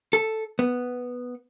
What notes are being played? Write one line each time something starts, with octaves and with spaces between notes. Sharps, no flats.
A4
B3